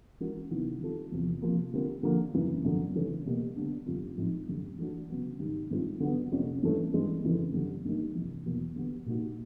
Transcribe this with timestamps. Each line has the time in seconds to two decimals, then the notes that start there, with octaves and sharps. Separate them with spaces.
0.20 E3 G#3 C#4 F#4 A#4
0.50 C3 D#3 F#3 B3 E4
0.81 D#3 G3 C4 F4 A4
1.12 E2 C3 F3
1.42 C3 F3 A#3
1.73 D3 G3 C4 F4 A#4
2.03 D3 F3 A#3
2.34 F#2 C#3 E3
2.65 F#2 D3 F3
2.95 C#3 E3 A3 C#4 E4
3.26 B2 G3 A#3
3.56 D3 G3 B3 D4
3.86 F#2 D3 G3 C4 F4
4.17 A2 F3 G#3 C4 D#4
4.48 F#2 D3 G3
4.78 E3 A3 D4 F#4
5.09 C#3 F#3 B3
5.40 G#2 D#3 G3
5.70 G2 D#3 G#3 C4 F4
6.00 D3 F#3 B3
6.32 F2 C3 F3 A#3 C#4
6.62 G2 E3 A3 C#4
6.93 G2 E3 G#3 C4
7.23 F2 C#3 E3 A3
7.53 F#2 D3 G3
7.85 G2 D#3 G3 A#3 D#4
8.15 F2 C3 E3
8.45 E2 B2 F#3 A#3
8.76 D3 G3 B3
9.06 A#2 G3 A#3 D#4 F#4